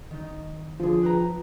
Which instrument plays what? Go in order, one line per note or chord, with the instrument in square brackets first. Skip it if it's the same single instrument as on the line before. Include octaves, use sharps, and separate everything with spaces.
[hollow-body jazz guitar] D#3 D#4
[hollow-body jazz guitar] D3 G#4 [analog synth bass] F3
[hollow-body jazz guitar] B4 G5 A#5